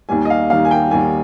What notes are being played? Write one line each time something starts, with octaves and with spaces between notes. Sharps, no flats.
D#2 D#3 G3 G#5
D#5
F5
D#2 D#3 G3 F5
G#5
G5
D#2 D#3 G3 G#5